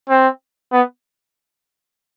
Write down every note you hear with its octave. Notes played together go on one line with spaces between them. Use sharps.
C4
B3